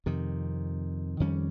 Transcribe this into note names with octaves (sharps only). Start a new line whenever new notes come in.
F2 C3 D#3
F2 D#3 G3 C#4